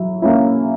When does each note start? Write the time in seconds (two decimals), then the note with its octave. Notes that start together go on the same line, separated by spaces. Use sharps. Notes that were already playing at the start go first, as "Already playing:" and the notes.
Already playing: F#3 E4
0.22 A#3 C#4 E4